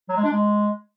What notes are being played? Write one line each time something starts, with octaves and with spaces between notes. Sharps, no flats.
F#3
G#3
D4
G#3